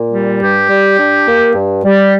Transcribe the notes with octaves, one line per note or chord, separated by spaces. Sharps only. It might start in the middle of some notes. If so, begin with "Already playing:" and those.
Already playing: A#2
G3
G2 G4
G3
D4
A#3
G2
G3